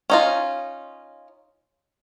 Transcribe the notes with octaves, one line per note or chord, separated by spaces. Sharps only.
C#4 D#4 F4